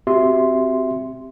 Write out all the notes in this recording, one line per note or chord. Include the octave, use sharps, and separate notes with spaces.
C4 F#4 G4 E5 C6